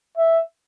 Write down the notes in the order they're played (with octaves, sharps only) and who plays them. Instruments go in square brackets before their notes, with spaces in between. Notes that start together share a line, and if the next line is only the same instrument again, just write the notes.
[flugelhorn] E5